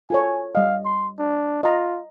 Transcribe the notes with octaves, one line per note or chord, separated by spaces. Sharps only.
F4 A4 C#5 G#5
G3 D#5 F5
C6
D4
F4 D#5 A#5